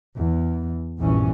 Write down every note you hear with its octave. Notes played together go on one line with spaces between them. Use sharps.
E2
A#1 E2 G2 A#2 E3 C#4